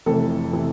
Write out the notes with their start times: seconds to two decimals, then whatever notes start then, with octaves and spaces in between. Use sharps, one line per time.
0.06 F1 F2 C3 E3 A4
0.53 C3 E3